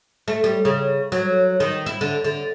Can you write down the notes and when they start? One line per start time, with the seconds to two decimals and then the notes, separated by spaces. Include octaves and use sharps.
0.28 A3
0.44 G3
0.65 C#3
1.12 F#3
1.60 D#3
1.86 E4
2.01 D3
2.24 D3